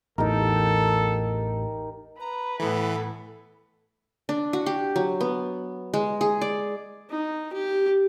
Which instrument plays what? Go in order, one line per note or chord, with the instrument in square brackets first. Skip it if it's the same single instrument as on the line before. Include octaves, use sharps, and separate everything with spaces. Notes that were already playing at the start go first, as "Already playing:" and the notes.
[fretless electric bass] A1 E2 [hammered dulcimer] D#4 G4 A#4 [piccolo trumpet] A4
[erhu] B4 [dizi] A#5
[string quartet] A2 B3 [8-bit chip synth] E3 [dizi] A4
[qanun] D4
F#4
G4
F#3
B3
G#3
G#4
D5
[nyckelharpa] D#4
G4